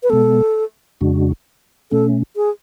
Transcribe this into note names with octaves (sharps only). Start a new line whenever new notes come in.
B4
B2 G#3 B3 A4
F2 C#3 G#3 D4 F#4
B2 A3 C#4 A4
G#4